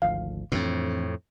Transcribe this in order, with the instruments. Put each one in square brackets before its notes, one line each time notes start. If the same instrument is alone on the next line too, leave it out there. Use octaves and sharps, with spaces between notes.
[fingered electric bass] G#1 D2 F3 [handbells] F5
[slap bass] F2 A2 [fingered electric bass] E3 C4 D4